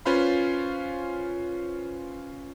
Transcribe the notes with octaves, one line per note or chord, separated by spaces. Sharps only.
C#4 F4 B4 C5 F5 B5